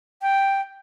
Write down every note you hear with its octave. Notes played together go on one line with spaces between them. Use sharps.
G5